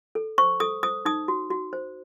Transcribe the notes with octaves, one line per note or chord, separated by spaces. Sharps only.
A4
C5 C#6
A4 D#6
C5 D#6
D#4 D#6
F#4
F#4
C5